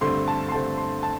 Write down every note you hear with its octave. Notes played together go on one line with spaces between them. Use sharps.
G2 D3 A3 C4 C6
A5
C6
G2 D3 A3 C4 A5
C6
A5